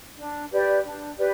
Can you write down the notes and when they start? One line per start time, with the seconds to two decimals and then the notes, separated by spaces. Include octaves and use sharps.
0.17 D4
0.51 G4 B4 D5
0.84 D4
1.18 G4 B4 D5